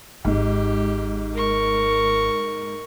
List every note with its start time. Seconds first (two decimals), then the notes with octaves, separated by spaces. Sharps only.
0.25 G#1 G#2 G4
1.34 A#4 C#6